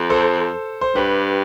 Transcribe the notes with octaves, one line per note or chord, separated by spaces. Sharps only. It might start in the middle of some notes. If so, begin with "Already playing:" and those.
Already playing: F2
A4 C5
C5
G2 G4 B4